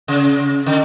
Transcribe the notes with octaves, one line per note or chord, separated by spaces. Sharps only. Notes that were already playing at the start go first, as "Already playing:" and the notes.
C#3
D3